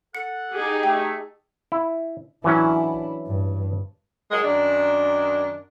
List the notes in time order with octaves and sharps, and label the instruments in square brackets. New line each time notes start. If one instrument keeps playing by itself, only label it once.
[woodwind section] A4 F#5 [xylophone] C#7
[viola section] D#4 G4 G#4
[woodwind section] A3 [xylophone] G5
[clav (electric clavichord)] E4
[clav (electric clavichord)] E3 F#3 C#4 [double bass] D4 E4
[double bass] G2
[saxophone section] D#3 F#3 G#3
F#2 D#3 D4